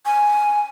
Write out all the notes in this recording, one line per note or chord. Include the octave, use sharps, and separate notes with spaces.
G#5